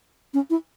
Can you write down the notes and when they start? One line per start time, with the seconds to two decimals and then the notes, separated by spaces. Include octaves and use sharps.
0.34 C#4
0.50 E4